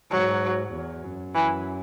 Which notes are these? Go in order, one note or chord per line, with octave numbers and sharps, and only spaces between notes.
G#2 F#3
E2
F#2
E3